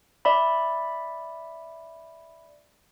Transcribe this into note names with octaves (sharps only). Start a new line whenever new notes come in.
D5 E5 B5